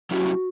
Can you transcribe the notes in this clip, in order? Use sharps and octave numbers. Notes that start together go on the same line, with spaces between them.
F#3 C#4 E4 F#4 G4